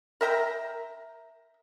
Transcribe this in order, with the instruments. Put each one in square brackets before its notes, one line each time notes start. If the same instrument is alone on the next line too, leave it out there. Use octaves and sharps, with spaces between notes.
[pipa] A#4 E5 G5 A#5